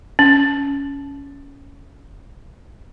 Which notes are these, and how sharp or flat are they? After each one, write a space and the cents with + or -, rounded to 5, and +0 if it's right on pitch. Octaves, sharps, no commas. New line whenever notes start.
C#4 +15